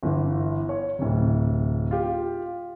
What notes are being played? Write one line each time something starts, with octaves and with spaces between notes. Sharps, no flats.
G1 E3
C#5
D1 C3
F4 G4